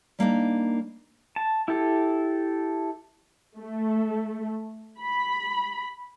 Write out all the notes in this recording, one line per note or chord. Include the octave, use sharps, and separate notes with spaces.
G3 A#3 D4 D#4
A5
E4 G4 A4
A3
B5